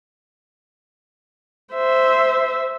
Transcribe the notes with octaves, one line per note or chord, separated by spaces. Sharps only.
C5 E5